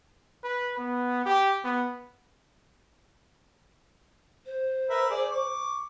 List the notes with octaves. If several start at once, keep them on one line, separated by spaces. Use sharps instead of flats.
B4
B3
G4
B3
C5
A#4 B4 E5
G#4 D5
C#6 D6